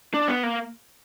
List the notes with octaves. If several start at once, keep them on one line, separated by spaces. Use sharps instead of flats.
D4
B3
A#3